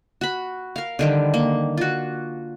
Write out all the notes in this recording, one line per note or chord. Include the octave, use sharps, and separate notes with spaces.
F#4 B5
A#4 F5
D3 D#3 G3
A#3
F4 F#4